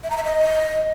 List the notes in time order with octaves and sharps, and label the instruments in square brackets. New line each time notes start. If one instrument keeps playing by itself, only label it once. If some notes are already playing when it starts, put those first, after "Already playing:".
[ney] E5
A#5
E5
D#5